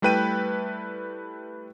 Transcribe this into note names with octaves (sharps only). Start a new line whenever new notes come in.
G3 A3 E4 B4 G5 D#7